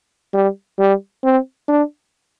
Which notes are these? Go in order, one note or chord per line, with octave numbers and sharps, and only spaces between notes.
G3
G3
C4
D4